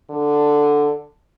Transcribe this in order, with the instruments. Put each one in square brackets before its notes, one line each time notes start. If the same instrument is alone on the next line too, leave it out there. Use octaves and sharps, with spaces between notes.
[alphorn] D3